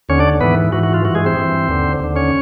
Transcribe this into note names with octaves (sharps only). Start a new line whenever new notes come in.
D#2 D3 C#4 C#5
D4 D5
G#2 E3 B3 B4
G#2 E3 F#4
F#4
F4
G2 E3 F#4
G#3 G#4
C4 C5
G2 E3
D#2 D3
D#2 D3
C#4 C#5